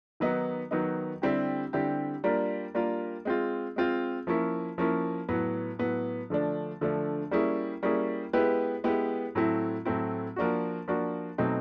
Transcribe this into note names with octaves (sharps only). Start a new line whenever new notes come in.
D#3 F#3 B3 D#4
D#3 F#3 B3 D#4
D3 G3 C4 E4 G4
D3 G3 C4 E4 G4
G3 A#3 D4 F4 A#4
G3 A#3 D4 F4 A#4
G#3 C4 F4
G#3 C4 F4
F3 A#3 C#4 E4
F3 A#3 C#4 E4
A2 F#3 B3
A2 F#3 B3
D3 F3 A3 D4
D3 F3 A3 D4
G3 A#3 C#4 E4 G#4
G3 A#3 C#4 E4 G#4
G#3 B3 E4 G4 B4
G#3 B3 E4 G4 B4
A2 F#3 A3 C4 E4
A2 F#3 A3 C4 E4
F3 A#3 D4 F#4
F3 A#3 D4 F#4
B2 F#3 A3 C4 D#4